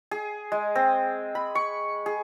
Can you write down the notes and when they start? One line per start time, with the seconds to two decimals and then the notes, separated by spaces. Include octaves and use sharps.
0.11 G#4
0.52 G#3
0.75 C4
1.35 B5
1.55 C#6
2.06 G#4